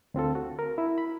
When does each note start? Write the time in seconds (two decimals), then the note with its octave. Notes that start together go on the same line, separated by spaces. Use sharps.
0.14 D2 C4 F4 A4
0.35 F#4
0.59 A#4
0.78 E4
0.98 B5